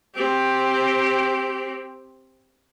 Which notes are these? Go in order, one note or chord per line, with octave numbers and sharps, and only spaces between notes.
C4 G4